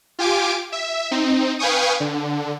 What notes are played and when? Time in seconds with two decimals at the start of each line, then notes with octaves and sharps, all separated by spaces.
0.19 F4 G4 G#5 D6 D7
0.72 E5
1.11 C4 D#4
1.59 B4 F5 G5 G#5 C#6 D#6
2.00 D3